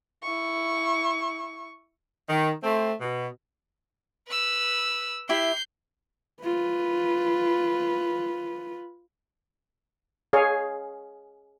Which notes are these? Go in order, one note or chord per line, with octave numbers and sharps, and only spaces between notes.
E4 C#6
D#3
A3 C4
B2
B4 E6
E4 G4 E5 G6 C7
F4 B4
G#4 C#5 F5